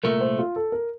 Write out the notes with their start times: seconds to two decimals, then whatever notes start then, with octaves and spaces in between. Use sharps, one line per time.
0.03 C2 A#2 A3 A#4
0.21 C5
0.39 F4
0.56 A4
0.72 A#4